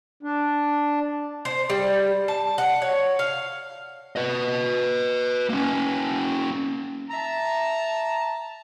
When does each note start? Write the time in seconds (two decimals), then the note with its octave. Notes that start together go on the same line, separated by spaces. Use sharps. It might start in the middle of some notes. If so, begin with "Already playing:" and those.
0.23 D4
1.45 C5
1.70 G3
2.28 A5
2.58 F#5
2.82 C#5
3.19 F5
4.16 B4 D#5
5.49 A#3 C#4
7.10 E5 A5 A#5